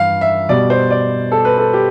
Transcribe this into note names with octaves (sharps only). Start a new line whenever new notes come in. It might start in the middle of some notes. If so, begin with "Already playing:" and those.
Already playing: G2 E3 F5
E5
B2 G3 D5
C5
D5
A4
B4
A4
G4